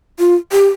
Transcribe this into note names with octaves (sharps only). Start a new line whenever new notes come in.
F4
G4